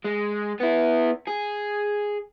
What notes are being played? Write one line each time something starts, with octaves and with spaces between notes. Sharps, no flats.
G#3
B3 E4
G#4